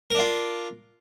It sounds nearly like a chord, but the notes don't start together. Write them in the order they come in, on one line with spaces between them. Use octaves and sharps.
A#4 D4 F4